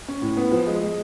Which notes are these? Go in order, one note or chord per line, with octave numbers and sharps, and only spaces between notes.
C#4
A2
B3
F3
G#3
G#3